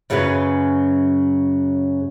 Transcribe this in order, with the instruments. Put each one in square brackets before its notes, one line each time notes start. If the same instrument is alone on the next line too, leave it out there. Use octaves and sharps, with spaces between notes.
[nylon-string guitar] F#2 C#3 F#3 C#4 G#4 B4